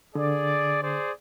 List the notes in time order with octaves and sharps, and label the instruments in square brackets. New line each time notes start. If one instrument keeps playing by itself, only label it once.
[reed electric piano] D3 [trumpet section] G#4 D5
[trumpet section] G#4 C5 D5